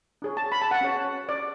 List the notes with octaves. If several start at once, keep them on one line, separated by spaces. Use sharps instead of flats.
D4 G#4 C#5
A5
B5
A5
F#5
C#4 G#4 C#5
D5